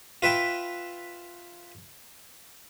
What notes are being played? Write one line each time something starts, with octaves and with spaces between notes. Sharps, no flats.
F4 B4 E5 G5